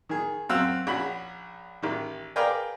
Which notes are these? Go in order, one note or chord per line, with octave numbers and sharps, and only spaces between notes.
D#3 G#4
F#2 C4 F5 F#5 E6
A#1 C#4 F#4 B5
A1 D#3
G#4 A#4 B4 D5 F5 G5